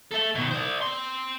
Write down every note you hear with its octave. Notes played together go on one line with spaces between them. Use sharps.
A4 E5
B2 D#3
C5 D5
C4 C6